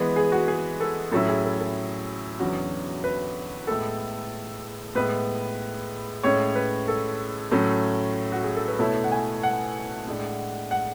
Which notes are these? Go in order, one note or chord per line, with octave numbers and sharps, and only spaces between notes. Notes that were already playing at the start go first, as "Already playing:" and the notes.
Already playing: E3 G#3 B3 B4
G#4
F#4
G#4
A4
A2 F#3 C#4 E4 A4
G#4
A4
A4
E2 D3 F#3 C#4 F#4
B4
A2 G#3 B3 A4
A2 G#3 B3 B4
A2 G#3 C#4 C#5
B4
A4
A2 F#3 A3 C#4
F#4
G#4
A4
B4
B2 A3 E4 A4 C#5
F#5
G#5
F#5
A2 G#3 D4
F#5